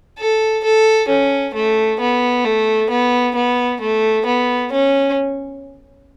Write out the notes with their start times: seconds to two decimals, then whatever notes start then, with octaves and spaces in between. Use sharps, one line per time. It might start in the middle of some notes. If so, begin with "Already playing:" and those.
0.19 A4
0.64 A4
1.09 C#4
1.55 A3
2.00 B3
2.44 A3
2.90 B3
3.35 B3
3.81 A3
4.26 B3
4.72 C#4